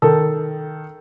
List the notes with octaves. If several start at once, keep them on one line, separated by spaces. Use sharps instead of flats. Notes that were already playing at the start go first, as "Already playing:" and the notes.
D#3 A4